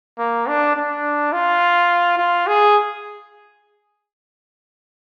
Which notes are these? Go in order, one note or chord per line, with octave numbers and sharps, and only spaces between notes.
A#3
D4
D4
F4
F4
G#4